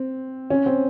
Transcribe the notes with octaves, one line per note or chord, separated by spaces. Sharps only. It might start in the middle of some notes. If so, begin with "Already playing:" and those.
Already playing: C4
C#4
C4